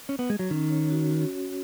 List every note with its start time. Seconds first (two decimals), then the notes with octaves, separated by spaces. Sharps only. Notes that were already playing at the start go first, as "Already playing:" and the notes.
0.09 C#4
0.19 B3
0.30 G#3
0.39 F#3
0.51 D#3 C#4
0.70 C#5
0.90 F#4
1.11 F#4